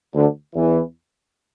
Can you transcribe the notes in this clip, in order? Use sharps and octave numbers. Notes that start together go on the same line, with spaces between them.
D2 D3
E2 E3